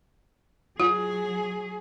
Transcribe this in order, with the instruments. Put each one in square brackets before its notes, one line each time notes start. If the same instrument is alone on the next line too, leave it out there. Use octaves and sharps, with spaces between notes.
[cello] F#3 G#4 [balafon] F4